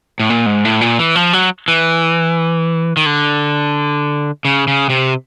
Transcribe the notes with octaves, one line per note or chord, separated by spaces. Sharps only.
A2
A#2
G#2
A2
A#2
E3
F3
F#3
E3
D#3
D3
C#3
C#3
C3